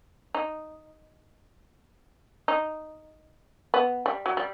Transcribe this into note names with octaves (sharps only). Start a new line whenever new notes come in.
D#4
D#4
B3
G3
F#3
G3